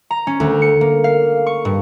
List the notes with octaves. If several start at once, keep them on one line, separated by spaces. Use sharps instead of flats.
A#5
C#4
D2
C#7
A#3
F5
C#6
G2